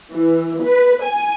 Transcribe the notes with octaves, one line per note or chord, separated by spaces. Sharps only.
E3
B4
G#5